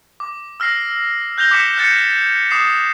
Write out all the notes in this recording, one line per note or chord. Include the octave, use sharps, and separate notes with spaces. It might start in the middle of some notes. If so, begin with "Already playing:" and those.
D6
E6 F6 A#6 C7
F#6 G6 A#6 F7 G7
D6 A#6 B6 C#7 E7
D6 F#6 G6 A6 C#7
D6 D#6 C7 E7